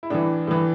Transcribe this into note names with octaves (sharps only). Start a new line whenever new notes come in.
E4
A2 E3 D4
A2 E3